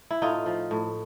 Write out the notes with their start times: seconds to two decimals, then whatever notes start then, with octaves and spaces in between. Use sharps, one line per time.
0.11 E4
0.22 A2 D#4 F4
0.46 F3
0.71 A2